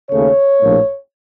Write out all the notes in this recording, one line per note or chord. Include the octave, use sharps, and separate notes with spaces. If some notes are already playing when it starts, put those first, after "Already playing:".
D#2 C#3 A3 C#5
A#1 A2 F3 A#3